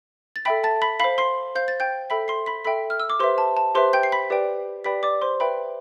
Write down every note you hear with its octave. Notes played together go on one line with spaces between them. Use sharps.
A6
A4 E5 G5 B5 B6
A5 A6
B5 B6
C5 F5 B5 B6
C6 C7
C5 F5 G6
A6
G5 G6
A4 E5 G5 B5 B6
C6 C7
B5 B6
A4 E5 G5 B5 B6
F6
E6
D6
G4 B4 C5 E5 C6
A5
A5
G4 B4 C5 E5 C6
G5 G6
C7
B5 B6
G4 B4 D5 G5
G4 B4 D5 G5 B5 B6
D5 D6
C5 C6
B4 C5 E5 G5 B5